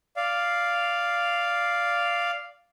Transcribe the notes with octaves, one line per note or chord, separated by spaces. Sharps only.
D5 F5